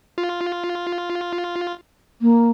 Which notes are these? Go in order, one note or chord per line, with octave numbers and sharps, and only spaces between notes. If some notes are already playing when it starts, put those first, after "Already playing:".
F4
A#3